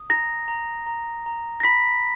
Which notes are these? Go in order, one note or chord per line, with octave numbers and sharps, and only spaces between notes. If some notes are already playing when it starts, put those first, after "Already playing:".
Already playing: D#6
A#5 A#6
A#5
A#5
A#5
A#6
B5 B6